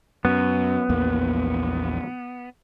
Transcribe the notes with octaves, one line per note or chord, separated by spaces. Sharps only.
F#2 B3
A#1 E2 A#3